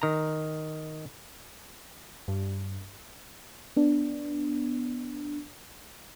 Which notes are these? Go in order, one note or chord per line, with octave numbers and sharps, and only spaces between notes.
D#3 A#5
G2
B3 D4